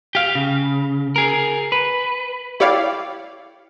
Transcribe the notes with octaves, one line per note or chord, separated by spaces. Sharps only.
G4 F5
C#3
G#4 A#4
B4
E4 G4 C#5 D5 F5